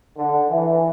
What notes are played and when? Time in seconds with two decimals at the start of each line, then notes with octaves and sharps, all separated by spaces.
0.17 D3
0.50 E3